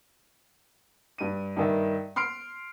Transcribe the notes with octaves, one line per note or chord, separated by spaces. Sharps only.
G2 D#7
G2 D#3 E5
C6 F6 C7 D7